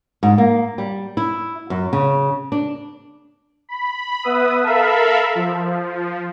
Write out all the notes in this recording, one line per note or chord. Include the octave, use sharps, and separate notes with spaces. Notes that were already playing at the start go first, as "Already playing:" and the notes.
G#2
A#3
G3
E4
F#2
C#3
D4
B5
B3 B4 E5 D#6
A4 A#4 E5 F5 B5
F3